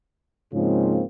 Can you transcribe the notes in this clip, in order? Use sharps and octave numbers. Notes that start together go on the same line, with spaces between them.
G#2 C#3 F3 G#3 A#3 C4